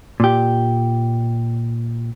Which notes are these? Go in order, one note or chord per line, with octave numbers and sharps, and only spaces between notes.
A#2 G4